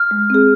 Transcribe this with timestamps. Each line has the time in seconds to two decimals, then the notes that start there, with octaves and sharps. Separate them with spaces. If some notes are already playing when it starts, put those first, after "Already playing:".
Already playing: F6
0.11 G#3
0.30 C4 G#4